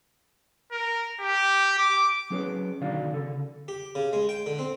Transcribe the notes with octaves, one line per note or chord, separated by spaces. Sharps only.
A#4
G4
D6
F#3 C#4 G#4 B4 C#5
B1 D3 D#3 F#4 D5 F5
C#3 A4
G4
C#3
G#3
G5
D3
C4